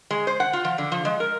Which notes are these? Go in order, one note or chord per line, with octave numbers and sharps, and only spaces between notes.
G#3
C5
F#5
F4
F3
D3
F3
G#3
A#4